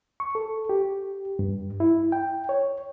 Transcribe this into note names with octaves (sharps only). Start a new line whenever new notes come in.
C#6
A4
G4
G2
E4
G5
C#5